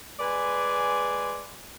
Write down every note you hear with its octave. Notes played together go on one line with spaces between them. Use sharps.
G#3 B4 D5 G#5 C6